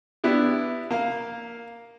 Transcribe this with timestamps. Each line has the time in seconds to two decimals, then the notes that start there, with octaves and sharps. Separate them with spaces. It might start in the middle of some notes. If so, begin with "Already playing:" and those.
0.24 B3 D4 E4 G4
0.91 A#3 F5